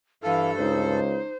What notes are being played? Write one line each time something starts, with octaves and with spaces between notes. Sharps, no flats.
G2 E3 A4 F5
C#2 D#4 C5